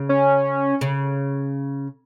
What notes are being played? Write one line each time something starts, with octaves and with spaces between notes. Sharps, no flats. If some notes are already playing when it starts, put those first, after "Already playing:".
Already playing: C#3
C#4
C#3